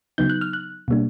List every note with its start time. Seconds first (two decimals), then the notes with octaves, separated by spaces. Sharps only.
0.18 C#3 F#3 B3 D#4 G6
0.30 F#6
0.41 F6
0.53 F#6
0.88 B2 G3 A#3 D4